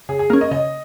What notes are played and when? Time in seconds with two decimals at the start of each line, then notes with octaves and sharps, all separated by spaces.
0.09 C#3 G#4
0.19 G#4
0.30 A#3 C#4 A#4
0.41 D#5
0.51 C#3 D#5